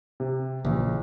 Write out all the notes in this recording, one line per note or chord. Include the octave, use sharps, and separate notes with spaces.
C3
A#1 C#3 E3